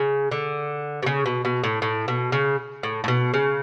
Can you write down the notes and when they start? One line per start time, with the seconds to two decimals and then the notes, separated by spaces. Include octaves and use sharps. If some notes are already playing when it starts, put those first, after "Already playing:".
Already playing: C#3
0.31 D3
1.02 B2
1.06 C#3
1.26 B2
1.45 B2
1.64 A2
1.82 A2
2.08 B2
2.32 C#3
2.83 A2
3.04 A2
3.08 B2
3.34 C#3